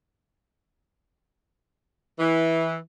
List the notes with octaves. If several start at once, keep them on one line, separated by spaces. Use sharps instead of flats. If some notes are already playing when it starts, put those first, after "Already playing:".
E3